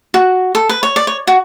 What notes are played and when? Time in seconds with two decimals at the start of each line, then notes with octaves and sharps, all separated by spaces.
0.14 F#4
0.55 A4
0.69 B4
0.83 C#5
0.96 D5
1.07 C#5
1.27 F#4